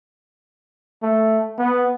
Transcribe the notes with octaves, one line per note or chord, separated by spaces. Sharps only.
A3
B3